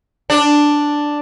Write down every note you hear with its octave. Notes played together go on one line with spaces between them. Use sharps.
D4